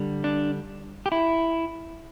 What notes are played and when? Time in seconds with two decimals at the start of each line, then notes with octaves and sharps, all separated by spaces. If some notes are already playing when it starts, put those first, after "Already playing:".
Already playing: D3 G3
0.24 D4
1.06 G4
1.12 E4